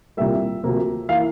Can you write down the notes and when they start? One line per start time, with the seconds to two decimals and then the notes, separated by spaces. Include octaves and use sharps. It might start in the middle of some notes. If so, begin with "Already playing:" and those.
0.17 C2 A#2 G3 A#3 E5
0.63 D2 C3 F3 A#3
1.09 E3 A#3 F5